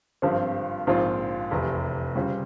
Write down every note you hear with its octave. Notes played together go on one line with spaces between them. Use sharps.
G#1 G2 F3 C4
A#1 G#2 F3 C4 F4
F1 E2 C3
C#3 G3 C4 F4